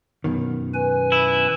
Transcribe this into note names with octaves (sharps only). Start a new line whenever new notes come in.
F#2 B2 D#3
B4 G#5
E4